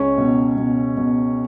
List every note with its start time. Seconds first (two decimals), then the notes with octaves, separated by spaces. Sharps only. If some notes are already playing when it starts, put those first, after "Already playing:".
Already playing: C#2 C#4 C#5
0.18 B2
0.57 B2
0.97 B2